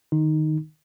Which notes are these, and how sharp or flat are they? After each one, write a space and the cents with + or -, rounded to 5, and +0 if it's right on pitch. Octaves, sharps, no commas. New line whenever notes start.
D#3 -15 D#4 +0